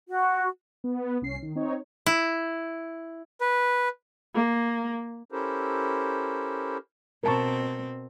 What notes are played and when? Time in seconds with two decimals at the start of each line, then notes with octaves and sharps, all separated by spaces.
0.07 F#4
0.84 B3
1.22 C2 C#4 C7
1.42 D#3
1.55 C4 D#4 C#5
2.06 E4
3.41 B4
4.35 A#3
5.32 C#4 E4 G4 A4 A#4 C5
7.23 B2 C4 A#4 A5 C#6